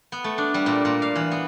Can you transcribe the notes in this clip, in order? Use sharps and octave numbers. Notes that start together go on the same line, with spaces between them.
B3
A3
D4
G3
A#2
A#2
F5
E3
B3